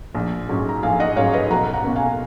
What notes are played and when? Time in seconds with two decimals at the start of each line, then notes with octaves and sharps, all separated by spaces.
0.14 A#1
0.49 G#2 F#3 C#4
0.69 A#5
0.83 A#1 F5 G#5
1.00 D#5 F#5
1.16 G#2 F#3 C#4 C#5 F5
1.33 B4 D#5
1.50 B1 F#5 A#5
1.73 F#5 A#5
1.84 B2 A#3 C#4
1.96 F5 G#5